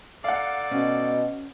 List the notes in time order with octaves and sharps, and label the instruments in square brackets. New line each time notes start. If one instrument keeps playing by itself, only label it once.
[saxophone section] D#4 A4 D5 [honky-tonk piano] F5 F#5
[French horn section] B2 D#5 [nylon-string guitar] C#4